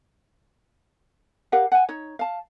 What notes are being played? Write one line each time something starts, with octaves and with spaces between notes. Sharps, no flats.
G4 A#4 F5 F#5
F#5 G#5
D#4 C#5
F5 A5